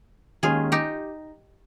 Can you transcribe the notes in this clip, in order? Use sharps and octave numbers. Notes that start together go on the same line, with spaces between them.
D#2 D#3 G#3 C#4 F4 G#4
D#4 G4